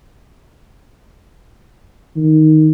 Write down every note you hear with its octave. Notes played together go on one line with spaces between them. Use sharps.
D#3